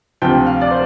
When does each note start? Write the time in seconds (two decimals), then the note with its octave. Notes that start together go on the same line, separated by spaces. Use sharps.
0.22 D2 C3 F3 G5
0.46 F5
0.61 D5
0.71 C5